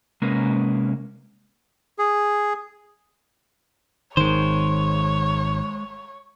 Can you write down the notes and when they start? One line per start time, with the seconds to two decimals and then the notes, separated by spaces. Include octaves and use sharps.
0.22 C3 G#3 A#3 C#4 A#4 B4
1.98 G#4
4.17 G#1 D#3 G#3 C5 C#5